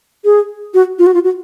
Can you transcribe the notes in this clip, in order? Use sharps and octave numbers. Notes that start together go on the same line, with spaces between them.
G#4
F#4
F4
F#4
F4
F#4